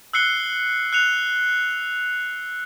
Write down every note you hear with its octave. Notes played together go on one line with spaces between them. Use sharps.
E6 F#6 C7 C#7 G7
F#6 C#7 F7